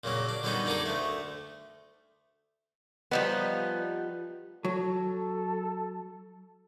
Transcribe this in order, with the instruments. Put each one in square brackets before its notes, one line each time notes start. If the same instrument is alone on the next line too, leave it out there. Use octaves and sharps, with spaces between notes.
[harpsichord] A#2 C#3 F#3 A#3
D4
D3 F#3 G3 B3 C#4 D#4
A#3 D4 D#4 G#4 A4
D2 A3
[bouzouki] F3 G3 D#4 [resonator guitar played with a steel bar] B3
[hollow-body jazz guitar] F#3 [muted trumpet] A4